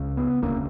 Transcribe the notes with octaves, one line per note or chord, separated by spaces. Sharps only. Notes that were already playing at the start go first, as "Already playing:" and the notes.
Already playing: C#2 C#3
B3
E1 D2 C#3 A#3